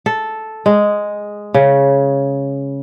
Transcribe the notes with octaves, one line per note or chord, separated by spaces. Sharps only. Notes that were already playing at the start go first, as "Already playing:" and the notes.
A4
G#3
C#3